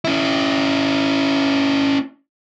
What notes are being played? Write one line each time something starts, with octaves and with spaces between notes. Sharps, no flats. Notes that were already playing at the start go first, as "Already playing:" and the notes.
C#4 E4